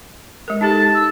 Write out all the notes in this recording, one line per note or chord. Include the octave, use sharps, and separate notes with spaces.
G#3 A#4
D#4 G4 A4 A5
E6